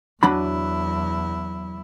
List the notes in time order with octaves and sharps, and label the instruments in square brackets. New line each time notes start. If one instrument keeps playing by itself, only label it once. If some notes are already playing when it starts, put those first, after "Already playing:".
[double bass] E2 E4 [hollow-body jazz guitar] F#3 D4 B5